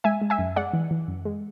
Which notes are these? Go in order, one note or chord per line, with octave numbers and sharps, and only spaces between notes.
G#3 E5 G#5
G#3
E5 G#5
F#2
G#3 D5 F#5
E3
E3
F#2
G#3